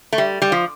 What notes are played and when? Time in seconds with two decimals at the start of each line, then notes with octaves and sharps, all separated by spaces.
0.13 A3
0.18 G3
0.42 G3
0.52 F3